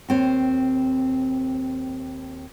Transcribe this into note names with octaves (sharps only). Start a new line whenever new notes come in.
D#2 C4 C#5